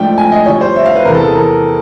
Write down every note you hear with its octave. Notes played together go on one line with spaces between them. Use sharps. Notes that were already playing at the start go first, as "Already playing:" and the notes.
Already playing: G#2 F3 A3 D4 F4 G5
G#5
D#5
F2 D3 G3 C#5
C5
E5
F5
B4
E2 C3 E3 A#4
A4
G#4
A#4